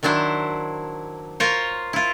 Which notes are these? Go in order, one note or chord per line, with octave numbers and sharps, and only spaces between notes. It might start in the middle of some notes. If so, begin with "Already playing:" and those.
D#3 F#3 D4 E4 C5
F4 A#4 C5 C#5
E4 F4